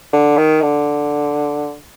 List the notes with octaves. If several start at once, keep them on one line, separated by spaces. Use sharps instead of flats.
D3
D#3
D3